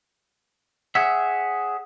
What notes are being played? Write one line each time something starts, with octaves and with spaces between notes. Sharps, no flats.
G#4 C#5 E5 F#5